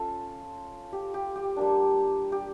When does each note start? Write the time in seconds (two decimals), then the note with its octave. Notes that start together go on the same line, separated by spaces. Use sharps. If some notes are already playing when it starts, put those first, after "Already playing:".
Already playing: C#4 F4 A4
0.93 G4
1.14 G4
1.36 G4
1.57 G3 A#3 D4
2.32 G4